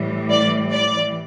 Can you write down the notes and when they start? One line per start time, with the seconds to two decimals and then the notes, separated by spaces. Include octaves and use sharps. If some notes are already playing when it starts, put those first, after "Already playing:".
Already playing: A2 E3 G3
0.30 D5
0.71 D5